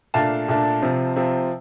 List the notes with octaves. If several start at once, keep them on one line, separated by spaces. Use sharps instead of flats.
A#2 A3 D4 F5 A5
A#2 A3 D4
C3 F3 C4
C3 F3 C4